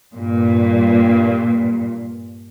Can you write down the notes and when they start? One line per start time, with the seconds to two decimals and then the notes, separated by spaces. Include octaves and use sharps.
0.16 G2 A#2